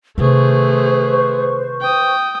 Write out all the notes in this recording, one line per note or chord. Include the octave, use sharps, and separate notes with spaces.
C3 D#3 A3 G#4 B4 C5 C#6
G5 D#6